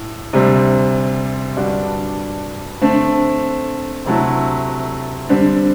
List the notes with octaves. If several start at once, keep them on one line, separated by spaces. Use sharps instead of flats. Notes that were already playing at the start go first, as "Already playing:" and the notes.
Already playing: A2
D2 C3 G3 C4
G2 D3 G3 D4 F#4
D3 A3 C4
D2 C3 F#3 A3 E4
D3 G3 C4